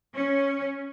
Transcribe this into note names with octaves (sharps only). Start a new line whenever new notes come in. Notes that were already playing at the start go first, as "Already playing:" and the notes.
C#4